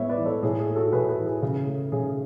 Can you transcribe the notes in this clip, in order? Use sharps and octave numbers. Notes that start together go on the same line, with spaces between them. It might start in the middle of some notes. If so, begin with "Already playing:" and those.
Already playing: A2 G#3 B3 C#5 E5
B4 D5
E3
A4 C#5
A2 G#4
G#4
A3
F#4 A4
A2 G#4 B4
G#4 B4
E3
G#4
C#3
A3
C#3 G#4